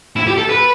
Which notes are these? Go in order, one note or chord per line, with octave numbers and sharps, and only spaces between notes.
E4
G4
A4
B4